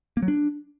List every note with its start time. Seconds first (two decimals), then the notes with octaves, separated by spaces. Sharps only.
0.17 A#3
0.22 F#3
0.28 D4